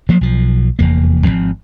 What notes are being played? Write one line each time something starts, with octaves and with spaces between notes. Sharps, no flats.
F3 F#3 A#3
B1 F3
F1 E2 A#3
G#1 F#2 F3 C4